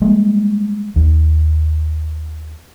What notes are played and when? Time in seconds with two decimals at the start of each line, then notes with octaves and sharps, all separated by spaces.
0.02 G3 G#3 A#3
0.96 D#2